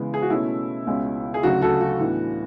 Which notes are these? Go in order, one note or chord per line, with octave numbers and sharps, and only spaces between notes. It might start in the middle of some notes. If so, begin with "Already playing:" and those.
Already playing: C#3 E3 G#3 B3
G#4
F#4
B2 A3 C#4 E4
C#2 B2 G#3 C#4
G#4
D2 C#3 F#3 F#4
F#4 A4
F#4
A2 E3 B3 D4